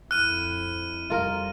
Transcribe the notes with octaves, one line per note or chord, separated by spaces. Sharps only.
F2 E4 F6 F#6 D#7
F2 G3 F4 A#4